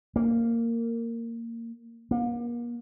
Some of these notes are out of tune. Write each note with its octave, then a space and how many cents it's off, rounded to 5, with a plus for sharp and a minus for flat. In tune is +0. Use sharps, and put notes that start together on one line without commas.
A#3 -15
A#3 +40